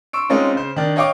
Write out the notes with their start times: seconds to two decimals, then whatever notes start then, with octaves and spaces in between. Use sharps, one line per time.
0.13 C6 C#6 E6 D7
0.29 G#3 C4 C#4 D#4 F4
0.55 C#3 C5
0.76 D#3 D4
0.96 C#5 D#5 F5 G5 C#6 D6